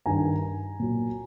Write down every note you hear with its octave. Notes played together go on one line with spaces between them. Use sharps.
G2 D#3 G3 G#5 A#5
A#2 F#3